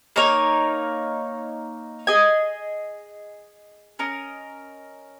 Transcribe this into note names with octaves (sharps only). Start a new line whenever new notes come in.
A#3 D#4 A#4 C#5
G#4 D#5 G#5
C#4 A#4 D#5